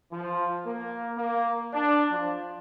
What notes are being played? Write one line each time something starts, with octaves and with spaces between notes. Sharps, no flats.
F3
A#3
A#3
D4
F3